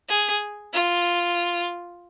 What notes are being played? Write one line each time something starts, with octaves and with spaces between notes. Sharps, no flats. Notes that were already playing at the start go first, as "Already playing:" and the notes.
G#4
F4